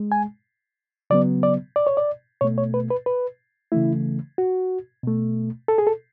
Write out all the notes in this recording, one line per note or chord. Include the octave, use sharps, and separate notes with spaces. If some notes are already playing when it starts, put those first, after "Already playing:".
Already playing: G#3
G#5
C#3 F#3 B3 D5
D5
D5
C#5
D5
B2 A3 C#5
C#5
B4
B4
B4
C#3 E3 A3 E4
F#4
B2 A3
A4
G#4
A4